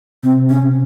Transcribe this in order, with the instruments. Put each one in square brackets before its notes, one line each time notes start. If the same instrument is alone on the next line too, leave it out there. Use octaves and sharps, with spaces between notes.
[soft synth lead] C3 [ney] C4
[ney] C#4
[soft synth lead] C3